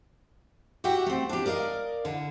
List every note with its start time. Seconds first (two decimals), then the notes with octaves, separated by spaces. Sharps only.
0.84 F#4 G4 E5 F#5 G5
1.06 A3 C4
1.29 D4 G4
1.46 A#4 D5 D#5 F5
2.05 D3 E4